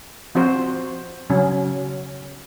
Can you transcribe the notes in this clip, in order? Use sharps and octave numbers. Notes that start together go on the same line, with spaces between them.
F3 C4 F#4 C5
C#3 F#3 C#4